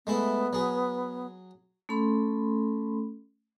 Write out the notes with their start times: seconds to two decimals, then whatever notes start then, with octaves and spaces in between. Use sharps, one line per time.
0.07 G#3 A3 B3 E4
0.53 F#3 G#4
1.89 A3 C#4 A4 B5 C6